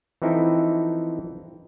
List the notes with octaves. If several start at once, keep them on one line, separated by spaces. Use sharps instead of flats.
E3 F3 C4 D#4 E4 A4